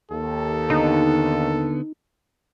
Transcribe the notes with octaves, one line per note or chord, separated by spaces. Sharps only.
D#2 A4
D3 B3 D#4